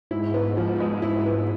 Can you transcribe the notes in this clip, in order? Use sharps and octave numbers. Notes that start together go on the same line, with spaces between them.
G#2 E4
B3
F3
G#3
E4
B3